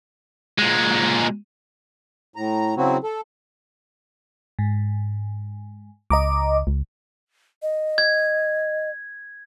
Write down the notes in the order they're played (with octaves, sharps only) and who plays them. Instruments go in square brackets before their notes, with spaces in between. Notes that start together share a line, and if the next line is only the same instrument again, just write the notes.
[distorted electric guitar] A#2 G#3
[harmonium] A2 A#5
C#3 F#3 C4 E4 F#4
A4
[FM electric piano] G#2
[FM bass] C#2 [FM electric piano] D#5 A#5 D6
[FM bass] C#2
[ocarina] D#5
[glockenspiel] G#6